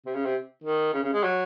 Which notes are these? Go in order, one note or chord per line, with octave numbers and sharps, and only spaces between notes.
C3
C#3
C3
D#3
C#3
C#3
G#3
F#3